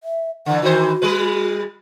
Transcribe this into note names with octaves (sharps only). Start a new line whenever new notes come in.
E5
D3 E3 F#5
D#3 E3 F#4 C5
G3 G#3 B4